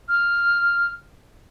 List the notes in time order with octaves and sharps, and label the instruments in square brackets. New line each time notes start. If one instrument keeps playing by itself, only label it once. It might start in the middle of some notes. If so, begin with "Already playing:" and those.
[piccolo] F6